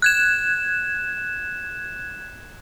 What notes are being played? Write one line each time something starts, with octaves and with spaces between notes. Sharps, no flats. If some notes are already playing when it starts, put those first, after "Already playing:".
F#6 G#6 E7